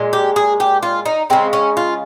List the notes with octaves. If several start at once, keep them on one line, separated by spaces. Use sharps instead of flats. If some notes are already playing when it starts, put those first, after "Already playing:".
Already playing: A#2 G#3
G4
G#4
G4
F4
D#4
C#3 G#3 C4
C#4
F4